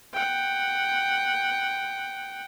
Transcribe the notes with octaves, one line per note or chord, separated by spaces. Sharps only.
F#5 G5